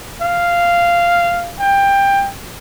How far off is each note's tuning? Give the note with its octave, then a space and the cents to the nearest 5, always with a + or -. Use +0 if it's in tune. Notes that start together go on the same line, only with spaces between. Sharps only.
F5 -10
G5 +20